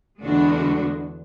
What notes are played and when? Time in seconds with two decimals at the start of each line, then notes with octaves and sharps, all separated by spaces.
0.21 E2 D3 G#3 D4 F#4